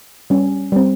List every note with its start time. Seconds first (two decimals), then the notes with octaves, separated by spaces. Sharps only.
0.30 G3 C#4
0.72 G3 C4